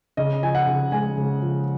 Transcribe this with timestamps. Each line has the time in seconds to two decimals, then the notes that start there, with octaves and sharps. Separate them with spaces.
0.17 C#3 D#5
0.42 F3 G#5
0.55 F#5
0.67 C#3
0.92 G#3 G#5
1.17 C#3
1.42 F3